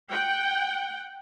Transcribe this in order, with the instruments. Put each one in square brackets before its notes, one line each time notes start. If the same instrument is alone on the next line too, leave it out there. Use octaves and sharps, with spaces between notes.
[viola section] F#5 G5